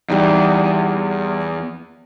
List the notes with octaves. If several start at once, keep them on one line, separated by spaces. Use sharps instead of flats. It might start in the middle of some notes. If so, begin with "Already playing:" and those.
E2 G3 D#4